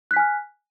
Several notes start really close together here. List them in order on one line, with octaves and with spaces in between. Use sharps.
F#6 B6 G#5 F6